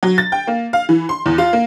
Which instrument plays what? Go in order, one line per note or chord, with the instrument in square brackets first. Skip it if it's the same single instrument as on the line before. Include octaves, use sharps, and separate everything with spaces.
[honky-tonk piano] F#3
A6
G5
A#3
F5
E3
C6
E2
F4
A#3